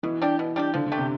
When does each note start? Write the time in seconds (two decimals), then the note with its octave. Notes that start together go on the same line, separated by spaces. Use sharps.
0.03 B2 E3
0.22 G3 D4 G4
0.39 B2
0.56 G3 D4 G4
0.74 D3 F3
0.86 D3
0.92 A3 D4 G4
0.98 C3